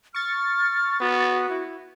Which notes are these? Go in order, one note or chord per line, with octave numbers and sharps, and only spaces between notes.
C#6 F6 A6
B3 F#4
E4